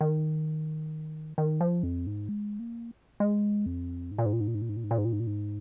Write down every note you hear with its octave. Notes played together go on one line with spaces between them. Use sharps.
D#3
D#3
F3
F2
G#2
G#3
A#3
G#3
F2
G#2
A#2
G#2
A#2
G#2
A#2
G#2
A#2
G#2
A#2
G#2
A#2
G#2
A#2
G#2
A#2
G#2